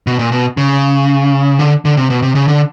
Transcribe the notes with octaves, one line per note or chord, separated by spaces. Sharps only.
B2
A#2
B2
C#3
D3
D3
C3
B2
C3
C#3
D3